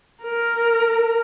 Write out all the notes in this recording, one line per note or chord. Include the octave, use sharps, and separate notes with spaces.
A#4